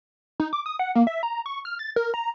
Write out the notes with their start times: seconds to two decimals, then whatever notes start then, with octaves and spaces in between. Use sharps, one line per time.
0.40 D#4
0.53 D6
0.66 D#6
0.79 F#5
0.95 A#3
1.07 E5
1.23 A#5
1.46 C#6
1.65 F6
1.79 A6
1.96 A#4
2.14 A#5